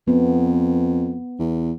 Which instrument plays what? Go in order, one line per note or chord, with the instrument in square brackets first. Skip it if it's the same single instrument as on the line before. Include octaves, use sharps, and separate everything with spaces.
[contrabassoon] F2 [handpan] B3
[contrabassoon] E2